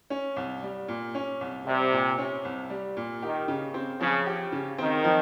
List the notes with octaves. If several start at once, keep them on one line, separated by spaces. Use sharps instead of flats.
C#4
C2
G3
A#2
C#4
C2
C3 G3
A#2
C#4
C2
G3
A#2
D#3 G4
C#3
C4
C#3 F3
G4
C#3
D#3 C4
F3